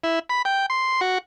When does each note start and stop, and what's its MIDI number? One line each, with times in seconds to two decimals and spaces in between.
0.04 0.19 64
0.29 0.42 83
0.45 0.66 79
0.70 1.01 84
1.01 1.18 66